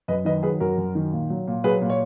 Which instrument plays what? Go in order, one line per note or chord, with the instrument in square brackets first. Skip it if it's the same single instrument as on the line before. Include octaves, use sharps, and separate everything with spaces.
[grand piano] F#2 B4 D#5
D#3 B4 D#5
F#3 G#4 B4
F#2 F#4 A#4
F#2
D#3
A#2
F#3
A#2
F#3 G#4 B4
A#2
C#5